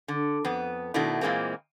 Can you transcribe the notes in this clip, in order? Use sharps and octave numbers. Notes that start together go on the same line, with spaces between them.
D3
F2 B3
B2 D#3 A3 D4 E4
A#2 E3 G#3 A#3 C4